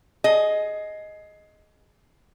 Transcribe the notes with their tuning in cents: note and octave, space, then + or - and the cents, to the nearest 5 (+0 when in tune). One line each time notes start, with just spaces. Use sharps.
G#4 +20 D#5 +0